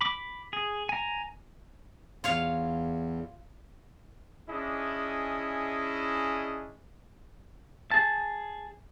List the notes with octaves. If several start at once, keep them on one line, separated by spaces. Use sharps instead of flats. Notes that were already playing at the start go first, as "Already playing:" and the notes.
B5 D6
G#4
G#5 A#5
E2 F4 C#5 F5
C#4 D4 E4 G#4 D#5
G#4 A5